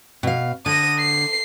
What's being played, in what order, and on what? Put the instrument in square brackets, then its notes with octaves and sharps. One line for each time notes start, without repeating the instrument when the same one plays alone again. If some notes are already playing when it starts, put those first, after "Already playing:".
[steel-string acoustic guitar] B2 F5
[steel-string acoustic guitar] D3 [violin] D#6 A#6
[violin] C7